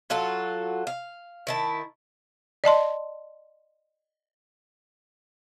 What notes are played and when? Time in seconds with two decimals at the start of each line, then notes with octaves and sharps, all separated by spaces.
0.10 F#3 F4 F#4 A4
0.87 F5
1.47 D#3 E4 A5
2.64 D5 D#5 A5 C6